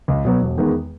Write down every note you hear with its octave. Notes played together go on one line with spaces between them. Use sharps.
C#2
B2 F#3 B3
E1
E2 D#3 G#3 B3